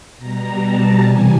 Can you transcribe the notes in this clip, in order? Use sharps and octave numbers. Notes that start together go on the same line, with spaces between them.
B2 G3 A#5
A5
C3 E3 G3 G#5